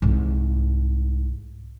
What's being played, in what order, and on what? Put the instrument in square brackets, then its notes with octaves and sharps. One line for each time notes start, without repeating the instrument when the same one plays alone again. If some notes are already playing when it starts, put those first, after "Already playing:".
[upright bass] C2 G#2